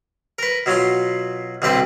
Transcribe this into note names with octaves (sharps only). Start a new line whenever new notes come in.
A#4 B4
B2 F#3 B3 F4 C6
C2 B2 D3 C4 B4 C5